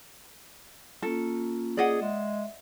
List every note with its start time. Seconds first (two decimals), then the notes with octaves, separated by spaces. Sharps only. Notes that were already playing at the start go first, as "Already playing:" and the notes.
1.02 A#3 C#4 F4 A4
1.77 G#4 D5 D#5 F#5
2.02 G#3 E5